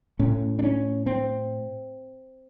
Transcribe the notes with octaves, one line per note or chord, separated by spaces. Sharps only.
A2 C#4
D4
C#4
C4